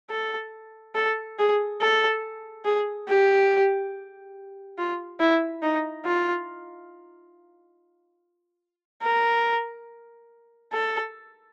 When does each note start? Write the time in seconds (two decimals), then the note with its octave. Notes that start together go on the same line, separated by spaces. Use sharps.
0.10 A4
0.95 A4
1.39 G#4
1.81 A4
2.65 G#4
3.09 G4
4.78 F4
5.20 E4
5.63 D#4
6.05 F4
9.03 A#4
10.73 A4